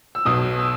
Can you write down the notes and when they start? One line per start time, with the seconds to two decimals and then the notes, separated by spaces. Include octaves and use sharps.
0.15 E6
0.25 B1 B2 D#6
0.59 E6